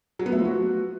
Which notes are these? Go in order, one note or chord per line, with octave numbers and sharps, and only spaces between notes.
F#3
B3
A3
F3
F#4